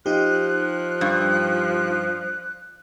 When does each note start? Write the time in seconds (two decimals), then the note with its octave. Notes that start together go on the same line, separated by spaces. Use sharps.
0.06 F3 D#4 G4 F#6
1.01 G2